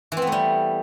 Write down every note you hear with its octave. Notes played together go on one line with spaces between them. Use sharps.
E3
C4
B3
A3
G3